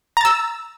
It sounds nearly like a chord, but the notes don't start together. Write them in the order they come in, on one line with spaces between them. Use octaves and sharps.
A#5 A6 E6